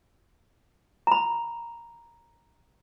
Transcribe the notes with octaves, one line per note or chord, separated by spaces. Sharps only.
A#5 B5